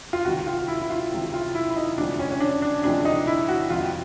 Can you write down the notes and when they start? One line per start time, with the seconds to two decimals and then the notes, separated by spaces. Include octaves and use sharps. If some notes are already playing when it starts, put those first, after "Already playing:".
0.13 F4
0.25 C#2 C3 D#3 F#3 F#4
0.47 F4
0.68 E4
0.82 E4
0.90 F4
1.11 C#2 C3 D#3 F#3
1.34 F4
1.55 E4
1.70 E4
1.76 D#4
1.98 D2 C3 F3 G#3 D4
2.19 C#4
2.30 C#4
2.40 D4
2.62 D4
2.84 D2 C3 F3 G#3 D4
3.05 D#4
3.27 E4
3.48 F#4
3.70 F2 C3 D#3 F4